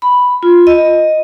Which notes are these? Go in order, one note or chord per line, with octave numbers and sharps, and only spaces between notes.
B5
F4
D#5